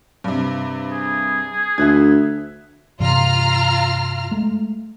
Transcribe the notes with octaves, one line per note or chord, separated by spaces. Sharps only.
G2 C3
G#4
D2 E5 F#6 G#6
G2 C3 E3 F4 A#5 F6
G#3 A3